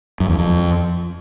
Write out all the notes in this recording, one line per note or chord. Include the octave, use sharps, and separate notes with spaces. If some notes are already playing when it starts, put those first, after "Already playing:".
F#2
E2
F2